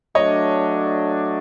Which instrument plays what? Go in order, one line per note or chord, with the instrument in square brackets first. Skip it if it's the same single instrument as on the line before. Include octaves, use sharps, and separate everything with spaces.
[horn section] F#3 A3 D4 [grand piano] C#5 D#5